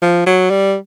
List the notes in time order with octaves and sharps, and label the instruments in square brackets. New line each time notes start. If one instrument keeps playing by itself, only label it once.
[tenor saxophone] F3
F#3
G3